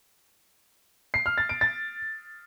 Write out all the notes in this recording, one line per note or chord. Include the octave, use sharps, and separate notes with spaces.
C7
F6
A6
D7
A6